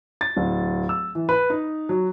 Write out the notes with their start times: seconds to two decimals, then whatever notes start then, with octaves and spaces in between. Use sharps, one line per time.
0.21 A6
0.37 D1
0.89 E6
1.15 E3
1.29 B4
1.50 D#4
1.89 F#3